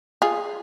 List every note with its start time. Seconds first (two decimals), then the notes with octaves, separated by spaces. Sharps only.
0.22 F4 G#4